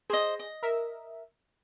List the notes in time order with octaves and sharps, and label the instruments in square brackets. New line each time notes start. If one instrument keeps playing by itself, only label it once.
[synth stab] G#4 [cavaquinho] C5 D#5
[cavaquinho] D#5
[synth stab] A#4 E5